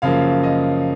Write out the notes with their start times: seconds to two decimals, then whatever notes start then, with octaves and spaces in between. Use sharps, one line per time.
0.02 F#2 C#3 F3 A#3 F5
0.43 D#5